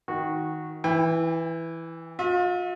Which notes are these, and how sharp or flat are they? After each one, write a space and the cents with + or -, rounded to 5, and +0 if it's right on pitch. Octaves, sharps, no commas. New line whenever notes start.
D#3 +15 F#4 -10
E3 +0 G5 +40
F4 +40 E5 -25